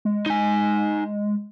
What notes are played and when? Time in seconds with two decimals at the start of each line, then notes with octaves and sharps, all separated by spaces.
0.05 G#3
0.26 D#4 G#5